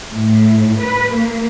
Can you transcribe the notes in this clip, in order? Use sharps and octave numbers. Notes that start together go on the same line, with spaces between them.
A2
B4
A#3